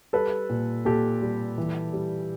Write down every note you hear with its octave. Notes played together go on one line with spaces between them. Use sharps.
G3 A4 B4
A#2
A#2 G4 A4
G3
E3
G3